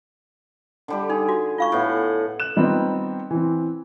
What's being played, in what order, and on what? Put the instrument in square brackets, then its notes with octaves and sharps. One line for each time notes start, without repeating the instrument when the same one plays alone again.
[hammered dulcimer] D3 G3 G4
[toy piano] D#4 [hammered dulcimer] G#4
[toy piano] F#4
F4 F5 C#6
[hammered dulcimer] A2 B3 F#5
[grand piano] F#6 E7
D#3 G3 B3 C4 D#4 F4
E3 C4